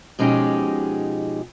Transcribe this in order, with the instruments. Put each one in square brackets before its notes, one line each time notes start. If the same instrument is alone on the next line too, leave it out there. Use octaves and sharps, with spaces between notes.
[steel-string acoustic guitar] B2 F3 G#3 C#4 D#4 G4